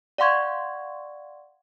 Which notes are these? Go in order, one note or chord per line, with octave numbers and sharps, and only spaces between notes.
D5 F5 F#5 C6 C#6 G#6